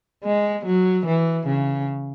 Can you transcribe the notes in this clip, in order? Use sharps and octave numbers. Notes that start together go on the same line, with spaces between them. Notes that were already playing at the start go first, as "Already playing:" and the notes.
G#3
F#3
E3
C#3